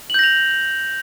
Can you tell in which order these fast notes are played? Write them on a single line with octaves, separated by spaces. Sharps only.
F#7 G6 A#6 F7